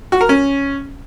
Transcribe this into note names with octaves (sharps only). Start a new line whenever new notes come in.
F#4
A#4
C#4